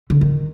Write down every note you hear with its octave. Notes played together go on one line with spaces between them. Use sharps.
D3
D#3